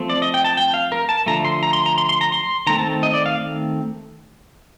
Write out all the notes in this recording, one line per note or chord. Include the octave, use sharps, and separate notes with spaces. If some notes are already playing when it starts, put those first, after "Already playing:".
Already playing: F3 A3 C4
D5
D#5
G5
A5
G5
F5
A#4
A5
D3 F3 A3 A#5
C6
A#5
C6
A#5
C6
C6
A#5
C6
D#3 A3 C4 A#5
A5
D#5
D5
F5